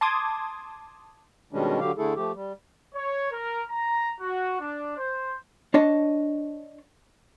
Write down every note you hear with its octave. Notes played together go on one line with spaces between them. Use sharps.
A5 C6 D6 D#6 G#6
B2 D#3 G3 G#3 C#4 D4
D3 F#3 G4 F5
D3 A3 E4 G#4 A4
F3 A3 G4
G3
C#5
A#4
A#5
F#4
D4
C5
D4 C#5 D#5 A5